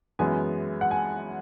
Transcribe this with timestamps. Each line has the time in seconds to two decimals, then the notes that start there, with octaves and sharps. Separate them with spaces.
0.19 F#2 E3 G#3 B3 G#5
0.81 F#5
0.91 G#5